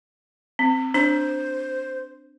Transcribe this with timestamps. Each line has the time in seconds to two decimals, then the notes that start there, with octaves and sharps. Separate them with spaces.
0.59 C4
0.94 D4 C5